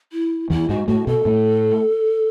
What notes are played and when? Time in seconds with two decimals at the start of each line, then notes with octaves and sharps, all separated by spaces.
0.12 E4
0.50 E2 E3 E4
0.69 G#2 G#3 F#4
0.88 A2 A3 F#4
1.07 B2 B3 A4
1.25 A2 A3